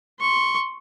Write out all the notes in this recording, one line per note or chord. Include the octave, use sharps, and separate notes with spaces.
C6 C#6